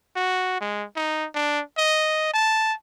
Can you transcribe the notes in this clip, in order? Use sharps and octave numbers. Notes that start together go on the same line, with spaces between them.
F#4
G#3
D#4
D4
D#5
A5